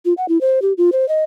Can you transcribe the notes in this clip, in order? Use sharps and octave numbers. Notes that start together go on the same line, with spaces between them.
F4
F#5
E4
C5
G4
F4
C5
D#5